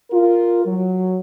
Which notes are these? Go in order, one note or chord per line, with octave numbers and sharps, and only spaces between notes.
F4 A#4
F#3